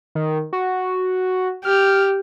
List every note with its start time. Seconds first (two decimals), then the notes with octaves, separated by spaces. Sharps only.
0.15 D#3
0.53 F#4
1.65 G4 F6